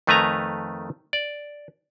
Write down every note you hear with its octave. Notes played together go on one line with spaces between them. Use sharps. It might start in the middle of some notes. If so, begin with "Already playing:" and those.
F2 D#3 A3 B4 G#5 A#5
D5